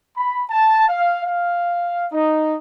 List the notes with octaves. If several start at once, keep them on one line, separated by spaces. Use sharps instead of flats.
B5
A5
F5
F5
D#4